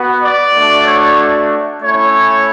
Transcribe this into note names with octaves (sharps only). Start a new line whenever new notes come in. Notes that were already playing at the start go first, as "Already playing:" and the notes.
Already playing: B3 F#4
D5
A3 D4 F#4
C#5
A3 C#4 E4 C#5